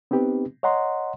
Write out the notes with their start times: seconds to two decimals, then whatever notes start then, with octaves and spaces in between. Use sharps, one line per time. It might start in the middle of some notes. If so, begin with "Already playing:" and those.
0.11 B3 C4 D#4 G4 B4
0.63 C#5 D#5 F#5 A#5 C6